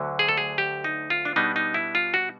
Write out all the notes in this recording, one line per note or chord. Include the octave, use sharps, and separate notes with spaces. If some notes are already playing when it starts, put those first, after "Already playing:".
Already playing: D2 D3 F#3
G#4
A4
G#4
G4
D#4
F4
D4
B2 G3 B3 D4 D#4
D#4
E4
F4
F#4